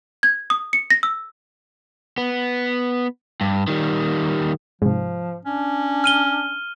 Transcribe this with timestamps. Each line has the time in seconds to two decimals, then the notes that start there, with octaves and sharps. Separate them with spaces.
0.23 G#6
0.50 D#6
0.73 C#7
0.90 A#6
1.03 E6
2.18 B3
3.41 G2
3.68 D#3 G3
4.82 G#2 C3 F3
5.45 C#4 D4
6.04 F6 D#7 G7